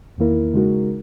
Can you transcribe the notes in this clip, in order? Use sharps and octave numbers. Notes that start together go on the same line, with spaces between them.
E2 D#3 A#3 E4 A#4
C#3 G#3 D#4 F#4 A#4